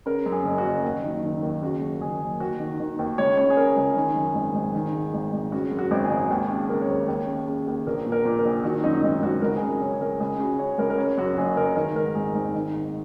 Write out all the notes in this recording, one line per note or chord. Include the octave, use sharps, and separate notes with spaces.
C#3 A#4
F#2
G#4
F#1
F#4
F#1
D#2
D#3
D#3
D#2
C#3 F#4
F#2
F#1 G#4
F#1
D#2 F#4
D#3
D#3
D#2
C#2 C#5
C#3 C#5
G#4
C#3 A#4
C#2 G#4
D#3
F#2
G#1
G#1
D#3
G#2
G#1
G#1
C#3 F#4
F#2
F#4
G#1
G#4
G#1
D#2
C#3
C#3 A#4
C#5
D#2 A#4
D#2 C#5
C#3
C#3
D#2
A#1 A#4
A#2
A#4
A#2
A#4
A#1
D#3 F#4
F#2 D#4
G#1 D#4
G#1 F#4
C#2 A#4
G#4
C#3 A#4
C#3 C#5
G#4
C#2 A#4
C#2 G#4
C#3 F#4
C#3 C#5
C#2 A#4
A#4
C#3 C#5
F#2 F#4
F#1 G#4
F#1 A#4
D#3 A#4
G#2 A#4
G#1 G#4
G#1 D#4
D#3
G#2